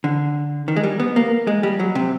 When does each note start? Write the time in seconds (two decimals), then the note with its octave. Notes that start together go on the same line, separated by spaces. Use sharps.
0.04 D3
0.68 D#3
0.76 G#3
0.84 G3
1.00 B3
1.16 A#3
1.47 G#3
1.63 G3
1.80 F#3
1.95 C3